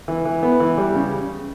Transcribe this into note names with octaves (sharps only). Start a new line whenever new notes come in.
E3
E3
B3
E3
G3
C#3